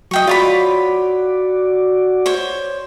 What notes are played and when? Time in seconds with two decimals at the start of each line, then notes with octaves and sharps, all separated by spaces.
0.11 F#3 D#5 G5 C#6
0.27 F4 F#4 C#5 D5 B5
2.26 C5 C#5